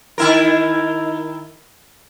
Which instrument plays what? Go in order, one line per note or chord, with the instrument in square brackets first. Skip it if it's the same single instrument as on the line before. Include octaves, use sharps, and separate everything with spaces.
[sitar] D#3 E4 A#4